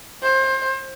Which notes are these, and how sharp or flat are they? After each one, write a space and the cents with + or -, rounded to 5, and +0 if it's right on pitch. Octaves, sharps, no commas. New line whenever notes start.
C5 +25